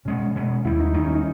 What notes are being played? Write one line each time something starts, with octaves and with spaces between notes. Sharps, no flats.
B2 G#3 B3 C#4
B2 G#3 B3
D#2 D#3 G3 E4
D#4
D#2 D#3 G3 D#4
C#4
D#4